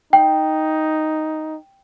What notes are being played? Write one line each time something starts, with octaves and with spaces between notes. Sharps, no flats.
D#4 G5